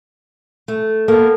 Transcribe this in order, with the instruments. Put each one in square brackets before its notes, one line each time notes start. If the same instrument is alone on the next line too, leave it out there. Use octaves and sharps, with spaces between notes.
[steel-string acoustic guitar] A3
[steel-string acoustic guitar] A#3 B3 [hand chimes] A4